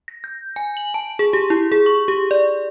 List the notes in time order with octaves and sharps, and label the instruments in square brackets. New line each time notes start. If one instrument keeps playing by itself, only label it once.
[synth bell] A#6
G6
G#5
F#7
A5
G#4
G4
E4
G#4
C#6
G4
D5